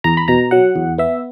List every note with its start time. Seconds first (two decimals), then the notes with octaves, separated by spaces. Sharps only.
0.04 E2 A#5
0.17 B5
0.28 B2 A#5
0.51 F#3 F#5
0.76 E2
0.98 B3 E5